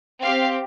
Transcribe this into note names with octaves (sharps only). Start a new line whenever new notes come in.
C4 G4 F5